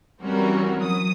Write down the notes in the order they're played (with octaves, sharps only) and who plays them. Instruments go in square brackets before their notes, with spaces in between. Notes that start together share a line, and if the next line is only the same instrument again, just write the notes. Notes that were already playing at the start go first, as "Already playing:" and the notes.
[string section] E3 G3 C4 C#4 F#4 A#4
F#3 D#6